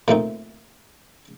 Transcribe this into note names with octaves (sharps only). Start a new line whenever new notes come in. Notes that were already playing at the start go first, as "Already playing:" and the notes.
A#2 F3 A3 C4 D#4